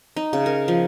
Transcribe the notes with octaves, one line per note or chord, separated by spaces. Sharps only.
D#4
C#3
A#4
F3